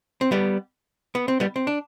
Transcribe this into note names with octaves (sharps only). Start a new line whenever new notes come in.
C4
G3 B3
B3
C4
G3 B3
C4
D4